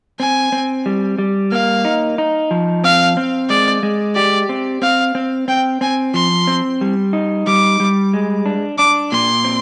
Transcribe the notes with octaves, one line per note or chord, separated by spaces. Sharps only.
C4 G#5
C4
G3
G3
A#3 F5
D#4
D#4
F3
C4 F5
C4
G#3 D5
G#3
G4 D5
C4
C4 F5
C4
C4 G5
C4 G#5
F3 C6
C4
G3
D#4
G3 D6
G3
G#3
D4
D4 D6
A#2 C6
C4